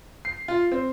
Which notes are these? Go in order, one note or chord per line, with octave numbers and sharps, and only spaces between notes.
C7
F4
C4